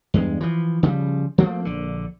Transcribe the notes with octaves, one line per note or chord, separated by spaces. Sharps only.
E2 G2 G#3
E3 F3
C#3 F3 G3
F3 A3 A#3 C4
A#1 D3